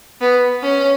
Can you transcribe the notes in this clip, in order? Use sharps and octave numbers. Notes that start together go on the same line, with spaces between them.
B3
C#4